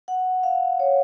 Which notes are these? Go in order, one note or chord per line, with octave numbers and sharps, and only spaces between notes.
F#5
F5
C#5